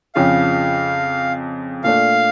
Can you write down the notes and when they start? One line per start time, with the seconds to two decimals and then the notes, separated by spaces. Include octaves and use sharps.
0.15 F2 C#3 F3 F5
1.84 A#2 A3 D4 F5